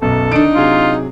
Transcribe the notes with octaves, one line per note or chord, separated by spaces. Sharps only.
B1 F#2 B2 A4
D#3 D4 D#4 D7
C3 F#3 F4 G#4